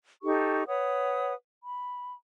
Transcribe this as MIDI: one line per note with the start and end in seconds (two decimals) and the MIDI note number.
0.23 0.63 63
0.23 0.63 67
0.23 0.63 69
0.23 0.63 85
0.67 1.33 71
0.67 1.33 73
0.67 1.33 78
0.67 1.33 87
1.62 2.13 83